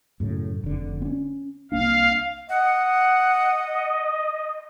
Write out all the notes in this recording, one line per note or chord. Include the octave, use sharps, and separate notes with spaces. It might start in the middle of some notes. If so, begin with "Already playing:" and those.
F#2 A2 C#3
F1 D3
C4 C#4
C2 A#3 D4 F5
D#5 F#5